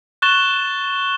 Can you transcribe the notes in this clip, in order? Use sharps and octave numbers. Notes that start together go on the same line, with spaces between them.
C#6 F#6 A6 E7 G7